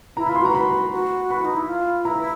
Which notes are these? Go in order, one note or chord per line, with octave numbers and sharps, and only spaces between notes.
E4 A#5
B5
F4
C6
F#4 A#5
B5
F#4
B5
D#4
E4
F4
E4 A#5